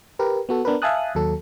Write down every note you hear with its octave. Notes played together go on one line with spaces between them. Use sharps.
G4 A#4 B4
B3 F#4 A4
B3 D4 A#4 B4
E5 F5 G#5 A5 D#6 F#6
D#2 F#3 A4